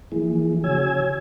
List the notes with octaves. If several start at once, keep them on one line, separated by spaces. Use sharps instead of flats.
E3 F3 A#3 E4 G#4
C#3 F#4 C#5 G#5 E6 G#6